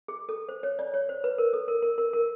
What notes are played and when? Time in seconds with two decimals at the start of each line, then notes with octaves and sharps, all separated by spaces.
0.08 G#4
0.29 A4
0.49 C5
0.63 C#5
0.79 D5
0.94 C#5
1.09 C5
1.24 B4
1.38 A#4
1.53 A4
1.68 A#4
1.82 A#4
1.98 A#4
2.13 A#4